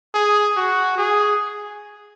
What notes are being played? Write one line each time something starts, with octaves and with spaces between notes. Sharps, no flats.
G#4
F#4
G#4